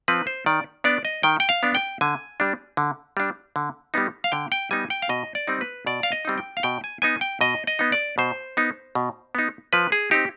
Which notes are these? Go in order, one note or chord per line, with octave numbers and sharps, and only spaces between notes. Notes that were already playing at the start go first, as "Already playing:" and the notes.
F3 C4 B4
C5
D#3 D5
B3 D4 D5
D#5
D#3 G5
G5
F5
B3 D4
G5
D3 G#5
G3 D4
D3
G3 D4
D3
G3 B3 D#4
F5
D3 G5
G5
G3 B3 D#4 G#5
G5
F5
B2 D#5
D5
G3 C4 D#4
B4
B2 D5
F5
D#5
G3 C4 D#4
G5
F5
B2 G5
G#5
B3 D#4 G#5
G5
B2 D#5
D#5
B3 D#4
D5
B2 C5
B3 D#4
B2
B3 D#4
F3 B4
G#4
C4 D#4 G4